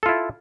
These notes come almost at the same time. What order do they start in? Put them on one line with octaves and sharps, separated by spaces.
A4 F4 E4